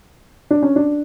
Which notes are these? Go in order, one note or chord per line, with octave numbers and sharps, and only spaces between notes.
D4
C#4
D4